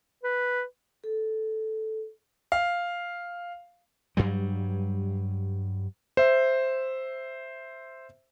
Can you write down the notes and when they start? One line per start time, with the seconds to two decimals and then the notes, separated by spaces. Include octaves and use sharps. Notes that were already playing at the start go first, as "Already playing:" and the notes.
0.23 B4
1.04 A4
2.52 F5
4.17 G2 F#3 G3
6.17 C5 E5